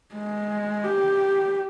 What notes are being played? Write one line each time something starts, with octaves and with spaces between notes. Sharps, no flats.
G#3
G4